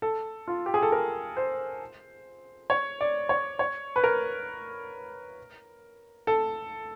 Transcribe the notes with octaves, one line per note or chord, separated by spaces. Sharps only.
A4
F4
G4
G#4
A4
A#4
C5
C#5
D5
C#5
C#5
B4
A#4
A4